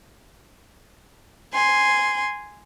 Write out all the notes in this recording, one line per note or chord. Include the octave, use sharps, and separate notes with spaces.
G#5 C6